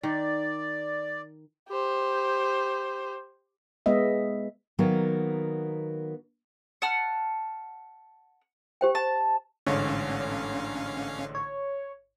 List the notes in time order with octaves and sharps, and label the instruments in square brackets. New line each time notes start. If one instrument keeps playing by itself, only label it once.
[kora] D#3 [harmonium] D5
[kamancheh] G4 C5
[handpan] G#3 B3 D#5 E5
[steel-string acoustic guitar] D#3 F#3 A#3 B3 A#4
[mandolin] F#5 A5 F6
[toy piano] G4 C5 G5
[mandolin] A5
[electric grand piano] A1 G#2 D3 [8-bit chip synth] C#4 F5 [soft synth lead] C#5
[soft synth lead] C#5